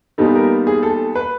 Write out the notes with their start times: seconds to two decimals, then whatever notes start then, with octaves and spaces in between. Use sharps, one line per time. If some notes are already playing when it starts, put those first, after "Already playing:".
0.18 A#2 G3 B3 D#4 A4
0.35 A#4
0.67 G#4
0.83 A4
1.15 B4